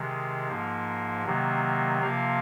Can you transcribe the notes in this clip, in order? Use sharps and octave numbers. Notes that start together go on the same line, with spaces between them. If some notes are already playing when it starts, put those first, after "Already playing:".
Already playing: C3 D#3 G#3
G#2 F3 A#3
C3 D#3 F#3 A#3
C3 F3 A#3 F5